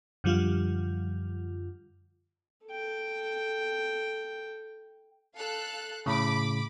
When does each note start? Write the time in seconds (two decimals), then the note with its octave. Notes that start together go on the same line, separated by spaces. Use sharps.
0.24 F#2 D3 F3 G3 F4
2.66 A4 G5
5.35 A4 F5 F#6
6.06 A2 C#3 B5 D6